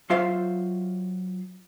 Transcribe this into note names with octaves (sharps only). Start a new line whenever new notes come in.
F#3 F4 F#4 C5 E5 F5